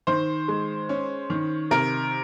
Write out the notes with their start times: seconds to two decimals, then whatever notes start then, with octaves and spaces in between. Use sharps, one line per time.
0.07 D#3 C5
0.48 G#3
0.89 C#4
1.30 D#3
1.71 C3 A#4